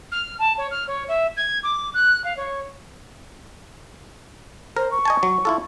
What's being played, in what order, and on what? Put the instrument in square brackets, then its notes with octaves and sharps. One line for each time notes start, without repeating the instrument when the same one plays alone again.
[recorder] F6
A5
C#5
F6
C#5
E5
G#6
D6
F#6
F5
C#5
[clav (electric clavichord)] A#4 [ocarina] C5
[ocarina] C#6
[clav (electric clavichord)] D#5 G#5 A5
F#3
E4 F4 A4